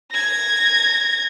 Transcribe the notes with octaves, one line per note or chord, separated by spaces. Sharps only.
G#6 A#6